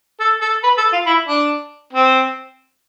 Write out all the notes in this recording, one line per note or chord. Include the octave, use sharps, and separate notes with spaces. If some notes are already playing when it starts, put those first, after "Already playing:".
A4
A4
B4
A4
F4
E4
D4
C4